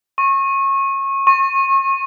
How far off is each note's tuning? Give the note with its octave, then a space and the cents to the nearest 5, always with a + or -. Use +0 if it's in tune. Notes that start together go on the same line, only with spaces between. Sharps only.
C#6 -25
C#6 -35